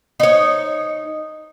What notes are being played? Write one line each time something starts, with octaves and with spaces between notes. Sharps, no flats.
D#4 C#5